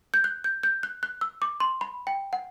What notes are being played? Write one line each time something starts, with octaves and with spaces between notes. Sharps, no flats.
G6
F#6
G6
G6
F#6
F#6
E6
D6
C6
B5
G5
F#5